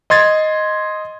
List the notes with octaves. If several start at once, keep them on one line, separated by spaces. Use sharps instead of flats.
D#5 C6 G#6 A6